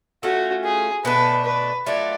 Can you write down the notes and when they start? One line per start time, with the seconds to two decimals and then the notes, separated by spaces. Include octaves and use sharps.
0.23 A3 C#4 F4 F#4
0.64 G#4
1.05 B2 A3 D4 B4
1.45 B4
1.86 F#3 A3 F4 D5